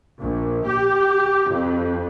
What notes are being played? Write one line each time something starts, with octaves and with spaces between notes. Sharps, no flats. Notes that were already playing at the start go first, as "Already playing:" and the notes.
A#1
G4
F2